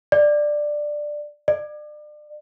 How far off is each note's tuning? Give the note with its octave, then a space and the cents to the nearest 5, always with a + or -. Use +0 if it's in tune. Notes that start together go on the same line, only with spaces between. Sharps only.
D5 +10
D5 +35